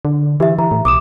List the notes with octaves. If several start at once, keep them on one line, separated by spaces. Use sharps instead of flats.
D3
E3 G4 E5
E3 A#5
A2
B1 D6 D#6 E7